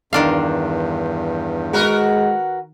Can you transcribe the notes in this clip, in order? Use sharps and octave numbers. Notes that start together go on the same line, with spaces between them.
E2 G2 D#3 D4 F5
G#3 F#4 A#4 B4